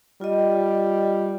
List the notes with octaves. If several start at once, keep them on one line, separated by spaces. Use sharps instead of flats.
G3 F4 D#5